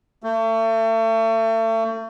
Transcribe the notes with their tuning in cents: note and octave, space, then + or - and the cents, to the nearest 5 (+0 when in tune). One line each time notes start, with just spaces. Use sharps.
A3 +35